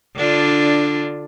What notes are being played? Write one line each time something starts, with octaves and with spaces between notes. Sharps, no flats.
D3 D4 F4